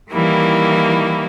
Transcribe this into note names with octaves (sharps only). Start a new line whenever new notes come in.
D#3 E3 G3 A#3 E4